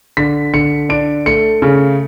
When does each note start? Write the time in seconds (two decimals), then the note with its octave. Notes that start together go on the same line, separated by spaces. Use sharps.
0.17 D3 B6
0.53 D3 C#7
0.89 D4 D7
1.26 A3 C#7
1.62 C#3